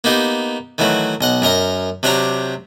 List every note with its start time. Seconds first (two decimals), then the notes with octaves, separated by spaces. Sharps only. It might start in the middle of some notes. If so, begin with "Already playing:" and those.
0.04 A#3 B3 D#4 G4
0.78 D#3 E3 F#3 A3 F#4
1.21 B1 D#5 F#5
1.42 F#2 A#4 D#5 A#5
2.03 C3 F#3 D4 G4 G5 A#5